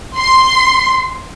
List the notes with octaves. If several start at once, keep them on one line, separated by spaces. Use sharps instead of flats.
C6